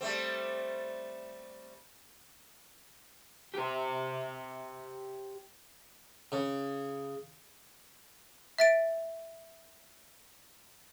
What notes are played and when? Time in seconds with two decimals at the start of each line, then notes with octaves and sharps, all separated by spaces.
0.01 G3 A3 C4
3.54 G4 C5
6.32 C#3
8.59 E5 A6 D7